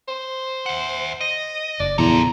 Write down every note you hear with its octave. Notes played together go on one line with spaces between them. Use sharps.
C5
E5 F#5
D#5
F#1 D5
E2 A#2 C#3 F3 A4 C5 A#5